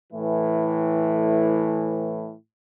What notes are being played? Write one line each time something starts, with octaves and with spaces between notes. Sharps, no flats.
A2 E3